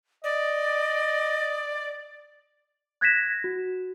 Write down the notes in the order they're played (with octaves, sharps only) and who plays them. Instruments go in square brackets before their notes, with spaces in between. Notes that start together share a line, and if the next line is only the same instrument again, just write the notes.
[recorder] D5 [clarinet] D#5
[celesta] F#6 G#6 A#6 B6 E7
F#4